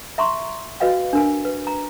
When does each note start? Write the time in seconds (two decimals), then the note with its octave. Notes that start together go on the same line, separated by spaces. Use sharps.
0.18 E5 A#5 C6 C#6
0.80 F#4 B4 D#5 F5 G5
1.13 D4 A#4 G#5
1.45 B4
1.67 A#5